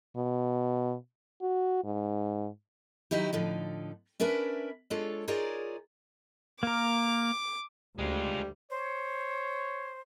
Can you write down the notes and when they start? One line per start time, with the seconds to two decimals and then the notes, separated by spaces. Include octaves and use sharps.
0.17 B2
1.42 F#4
1.84 G#2
3.11 D#3 F#3 D#4 E4 G4
3.33 A2 D3 F3 D#4
4.20 C#4 D4 A#4 B4 E5
4.90 G#3 D4 F4 A4 C#5
5.28 D#4 F4 G#4 A#4 C#5 D5
6.63 A#3 A#4 D6
7.99 D2 G3 G#3 F4
8.70 C5 C#5